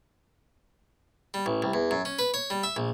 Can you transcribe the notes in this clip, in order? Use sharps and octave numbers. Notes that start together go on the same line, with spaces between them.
G3
A1
C2
E2
F#2
C#4
B4
C#5
G3
E5
A#1